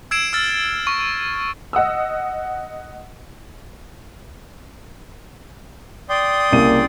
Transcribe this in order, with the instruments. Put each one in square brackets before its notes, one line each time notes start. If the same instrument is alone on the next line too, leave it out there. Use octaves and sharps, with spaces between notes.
[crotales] E6 G#6 C7 D7 E7
E6 F6 A6
C#6
[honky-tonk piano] D#5 F#5 D#6 E6
[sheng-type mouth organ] D5 G5 C6 [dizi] D#6
[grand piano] C2 C#3 D#7 [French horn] A#3